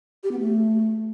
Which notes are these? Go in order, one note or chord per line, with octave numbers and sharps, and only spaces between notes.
G4
B3
A3